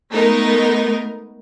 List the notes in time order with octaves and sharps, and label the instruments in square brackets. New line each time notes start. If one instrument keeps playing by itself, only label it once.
[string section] G#3 A3 B3 D#4 A#4